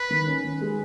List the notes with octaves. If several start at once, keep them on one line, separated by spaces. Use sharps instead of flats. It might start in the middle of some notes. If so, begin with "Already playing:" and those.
Already playing: B4
D#3
C#4
D#3
G#3